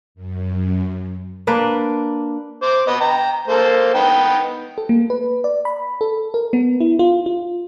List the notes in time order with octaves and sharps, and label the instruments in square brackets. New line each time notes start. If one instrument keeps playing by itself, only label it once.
[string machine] F#2
[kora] A#3 D4 B4 D5
[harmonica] C5 D6
B3 D#5
G5 A#5
A#3 A4 C5
B3 D#4 G5
[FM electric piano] A4
A#3
B4
D5
B5
A4
A#4
B3
E4
F4
F4